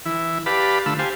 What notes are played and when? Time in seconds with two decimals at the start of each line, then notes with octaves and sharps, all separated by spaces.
0.06 E3 E4
0.46 G4 B4 D5 F5 A5 B5
0.86 D3 A3 F4 B5 E6
0.99 G4 C5 F5 G#5 A5